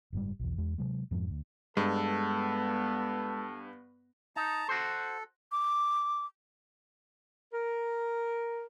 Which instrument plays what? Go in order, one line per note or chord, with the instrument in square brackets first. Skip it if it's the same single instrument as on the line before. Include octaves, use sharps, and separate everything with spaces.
[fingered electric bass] F#1 G#2 G3
B1 E2
E2 G#3
C3 F#3 G#3
F2 G#2 F3 G#3
D2
[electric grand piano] G2 [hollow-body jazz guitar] G#3 [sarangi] B3 [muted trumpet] A4
[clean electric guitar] D#4 [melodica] A5 A#5
[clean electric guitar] F#4 C5 [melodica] A4
[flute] D6
[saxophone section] A#4